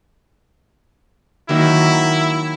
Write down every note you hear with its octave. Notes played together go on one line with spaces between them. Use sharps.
D#3 F#3 A#3 E4